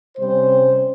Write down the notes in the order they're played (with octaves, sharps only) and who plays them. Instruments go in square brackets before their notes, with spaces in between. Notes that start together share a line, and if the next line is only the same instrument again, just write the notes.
[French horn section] C3 G3 C#4 C5